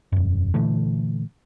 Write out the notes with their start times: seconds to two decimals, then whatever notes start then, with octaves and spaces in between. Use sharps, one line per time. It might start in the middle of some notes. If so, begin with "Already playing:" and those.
0.12 E1 F#2
0.54 A#2 D3 E3 A3